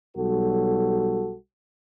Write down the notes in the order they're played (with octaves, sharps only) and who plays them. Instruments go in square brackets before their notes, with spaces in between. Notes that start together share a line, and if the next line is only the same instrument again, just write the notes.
[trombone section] B1 G3 F#4 A4